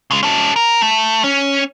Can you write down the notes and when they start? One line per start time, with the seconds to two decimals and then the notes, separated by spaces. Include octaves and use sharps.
0.11 C#3 G#3
0.23 C#4 A4
0.56 A#4
0.82 A3
1.24 C#4